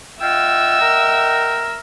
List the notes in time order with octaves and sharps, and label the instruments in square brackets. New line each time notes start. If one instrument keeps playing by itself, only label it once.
[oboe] F4 [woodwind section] D#5 F#5 G5 [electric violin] E5 E6
[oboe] A#4